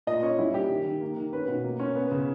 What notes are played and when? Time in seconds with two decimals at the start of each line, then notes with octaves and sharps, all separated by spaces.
0.07 A#2 D#5
0.22 C#4 C#5
0.38 G3 E4
0.54 A#3 G4
0.70 D#3
0.86 D#3
1.01 A#3
1.17 D#3
1.33 C#4 B4
1.48 B2
1.64 A#3
1.80 C#4
1.95 B3
2.11 C#3